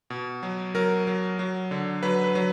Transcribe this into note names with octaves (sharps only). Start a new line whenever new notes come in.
B2
F#3
F#3 A#4
F#3
F#3
D3
F#3 B4
B4
F#3